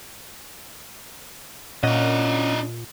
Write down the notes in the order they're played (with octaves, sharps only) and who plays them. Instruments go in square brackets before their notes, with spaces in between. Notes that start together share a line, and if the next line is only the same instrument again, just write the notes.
[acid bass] A#2 [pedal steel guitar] C#4 F#5 [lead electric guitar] D4 D#5